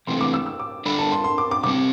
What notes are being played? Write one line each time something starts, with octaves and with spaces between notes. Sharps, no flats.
E2 C3 E3 A3 C4 C6
D6
E6
E6
D6
G3 D4 A4 D5 B5
A5
C6
C6
D6
D6
C3 G3 C4 D6